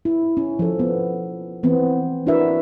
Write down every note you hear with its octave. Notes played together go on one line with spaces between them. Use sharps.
E4
C#4
F3 A4
B3
E3 B3 C4
D4 E4 F#4 A#4 B4 E5